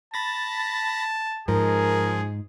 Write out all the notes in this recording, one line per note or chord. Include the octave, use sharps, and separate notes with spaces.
A5 B5 A6 A#6
G#2 F3 G#4 A#4